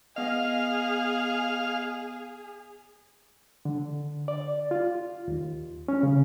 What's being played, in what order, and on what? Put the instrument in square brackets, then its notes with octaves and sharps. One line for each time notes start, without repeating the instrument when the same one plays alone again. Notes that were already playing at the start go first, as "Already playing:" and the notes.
[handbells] B3 D#5 [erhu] G#4 [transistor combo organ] F5
[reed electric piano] D3
D5
F4
D#2
C#4
C#3